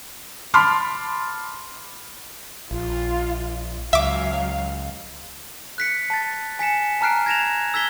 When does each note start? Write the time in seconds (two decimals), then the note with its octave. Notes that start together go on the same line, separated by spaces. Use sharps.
0.54 A5 B5 C6 D6 F6
2.71 A#1 F4
3.93 C#2 F#3 E5 F5 D6
5.78 F#6 B6 C#7
6.10 A5 A6
6.59 G#5 B6 C#7 E7
7.01 A5 A#5 F6 F#6 C7 D7
7.26 G#6 A#6 E7 F7
7.74 E6 G#6 B6 G7